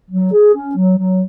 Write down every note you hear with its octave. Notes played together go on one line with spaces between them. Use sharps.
F#3
G#4
C#4
F#3
F#3